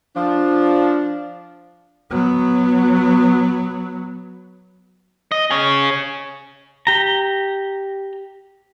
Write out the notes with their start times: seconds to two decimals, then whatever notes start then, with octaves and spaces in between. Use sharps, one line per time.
0.16 F3 D4
2.11 F#3 B3
5.32 D#5
5.50 G#4 C#5
6.87 G4 A#5